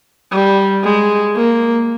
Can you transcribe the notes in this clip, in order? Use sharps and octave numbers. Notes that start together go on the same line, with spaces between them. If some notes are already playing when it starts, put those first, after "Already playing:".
G3
G#3
A#3